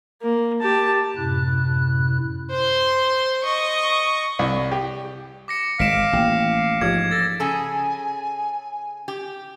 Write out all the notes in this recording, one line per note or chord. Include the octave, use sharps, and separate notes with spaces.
A#3
G4 A5
F#2 A2 C3 E4 F#6
C5 C6
D#5 C#6
C2
G4
D6 A#6 C#7
G#1 G#3 F5 B6 D7 E7
A1 A#3 G5
G#2 F3 F4 G4 G#6
A4 A6 A#6
C#3 G#4 A4 G#5
G4